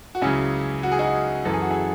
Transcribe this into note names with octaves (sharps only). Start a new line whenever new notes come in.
F#4
C#2 C#3 F#3 C#4 E4
F#4
G#4
D#4 F#4
F#2 E3 A4
G#4
F#4
E4 G#4